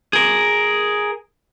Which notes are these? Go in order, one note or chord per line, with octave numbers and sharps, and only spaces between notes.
G#4 A#4